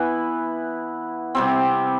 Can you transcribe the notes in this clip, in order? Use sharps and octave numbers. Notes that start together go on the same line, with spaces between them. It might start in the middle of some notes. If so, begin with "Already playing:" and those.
Already playing: E3 B3 E4 B4
C3 G3 C4